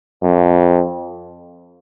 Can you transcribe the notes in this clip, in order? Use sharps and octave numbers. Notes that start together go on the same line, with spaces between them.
F2